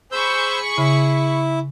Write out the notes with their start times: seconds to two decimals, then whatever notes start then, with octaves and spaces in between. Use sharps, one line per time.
0.12 G#4 C5 B5 C#6 E6 G6
0.78 C#3 E4